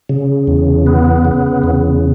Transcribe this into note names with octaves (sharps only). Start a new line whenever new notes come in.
C#3
E2
B3
C#3
E2